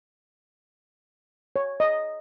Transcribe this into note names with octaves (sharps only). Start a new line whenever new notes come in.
C#5
D#5